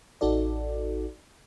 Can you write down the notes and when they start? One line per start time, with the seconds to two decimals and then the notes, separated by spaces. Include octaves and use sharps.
0.21 A1 D#4 F#4 A4 D5